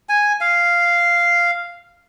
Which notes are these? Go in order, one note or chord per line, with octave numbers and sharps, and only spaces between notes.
G#5
F5